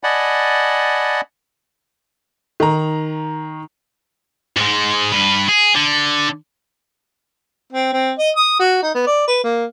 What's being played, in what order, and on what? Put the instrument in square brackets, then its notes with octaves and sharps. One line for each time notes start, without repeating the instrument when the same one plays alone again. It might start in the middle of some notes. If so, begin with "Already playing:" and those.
[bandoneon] D5 D#5 F#5 G#5 A5 B5
[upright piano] D#3 A#5
[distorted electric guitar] G#2 G#3
G2 B4
G#4
D3
[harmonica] C4
C4
D#5
D#6
F#4
D#4
B3
D5
B4
A#3